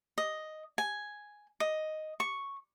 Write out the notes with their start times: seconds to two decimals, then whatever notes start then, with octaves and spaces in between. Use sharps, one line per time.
0.18 D#5
0.78 G#5
1.60 D#5
2.20 C#6